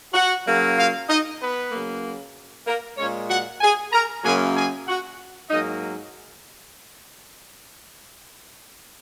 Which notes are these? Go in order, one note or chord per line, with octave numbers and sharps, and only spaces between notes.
F#4 F#5
C#3 F#3 A#3
F4 F5
D#4 D#5
B3 B4
C#3 F#3 A#3
A#3 A#4
A#2 G#3 C#4 C#5
F#4 F#5
G#4 G#5
A#4 A#5
F#2 C#3 F#3 A#3 G#4 G#5
G#4 G#5
F#4 F#5
G#2 F#3 A#3 D#4 D#5